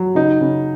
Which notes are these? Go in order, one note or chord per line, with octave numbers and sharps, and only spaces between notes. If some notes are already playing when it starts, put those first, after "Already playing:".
Already playing: F#3
C#3 D#4
C#3